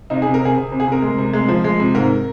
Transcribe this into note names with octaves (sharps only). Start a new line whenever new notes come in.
C3 D#4
G#4
C3
A#4
C3 G#4
C3
C3
G#4
C3 A#4
G#3
C3
G#3
F3
G#3
C3
G#2 A#4